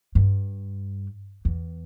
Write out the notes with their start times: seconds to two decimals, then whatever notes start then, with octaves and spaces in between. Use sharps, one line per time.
0.15 G2
1.45 E2